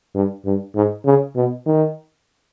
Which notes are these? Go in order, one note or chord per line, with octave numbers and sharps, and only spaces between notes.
G2
G2
G#2
C#3
B2
D#3